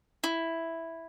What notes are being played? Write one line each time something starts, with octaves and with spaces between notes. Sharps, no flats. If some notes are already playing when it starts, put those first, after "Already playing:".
E4